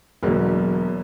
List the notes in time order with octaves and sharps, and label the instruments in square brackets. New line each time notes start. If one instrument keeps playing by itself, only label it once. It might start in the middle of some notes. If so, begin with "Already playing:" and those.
[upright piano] E1 F#3 [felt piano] B2 D3 A#3